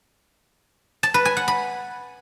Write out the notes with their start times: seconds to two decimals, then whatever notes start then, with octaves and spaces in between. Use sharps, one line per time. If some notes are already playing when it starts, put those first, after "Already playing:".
1.03 A5
1.14 B4
1.25 G#5
1.37 F#5
1.48 B5